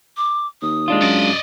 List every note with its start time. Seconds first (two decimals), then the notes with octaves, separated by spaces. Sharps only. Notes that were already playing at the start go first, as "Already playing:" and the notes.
0.17 D6
0.62 D#2 D#6
0.88 G#3 D4 F4
1.02 F#2 D5 D#5